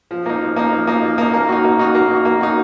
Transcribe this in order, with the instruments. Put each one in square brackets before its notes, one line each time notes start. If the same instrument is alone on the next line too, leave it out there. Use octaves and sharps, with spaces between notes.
[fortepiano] F3
A#3 D#4
F3
A#3 D#4
F3
A#3 D#4
F3
A#3 D#4
A#3
D#4 F#4
A#3
D#4 F#4
A#3
D#4 F#4
A#3
D#4 F#4